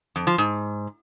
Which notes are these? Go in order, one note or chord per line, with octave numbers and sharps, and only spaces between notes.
F2
F3
G#2